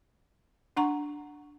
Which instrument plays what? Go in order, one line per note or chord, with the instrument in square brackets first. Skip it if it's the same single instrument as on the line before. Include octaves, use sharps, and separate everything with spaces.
[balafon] D4 F#5 A#5 C#6